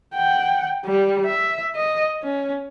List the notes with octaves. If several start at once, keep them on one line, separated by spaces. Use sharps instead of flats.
F#5 G5
G3
E5
D#5
C#4